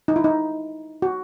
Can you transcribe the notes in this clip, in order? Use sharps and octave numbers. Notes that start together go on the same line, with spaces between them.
D#4
E4
D#4
F#4